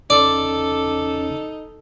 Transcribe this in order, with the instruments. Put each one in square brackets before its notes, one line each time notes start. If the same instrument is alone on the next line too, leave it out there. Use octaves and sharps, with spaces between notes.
[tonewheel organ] E2 C#3 C#4 [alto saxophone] D#4 [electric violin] A4 [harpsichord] D5